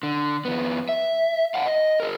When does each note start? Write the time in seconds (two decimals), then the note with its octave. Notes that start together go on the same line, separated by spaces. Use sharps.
0.03 D3
0.45 F2 B3
0.89 E5
1.54 F5 F#5 A5
1.66 D#5
2.00 G#4 A#4